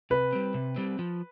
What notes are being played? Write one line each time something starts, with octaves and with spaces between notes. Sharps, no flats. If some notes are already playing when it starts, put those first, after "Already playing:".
C3 B4
G3 C4
C3
G3 C4
F3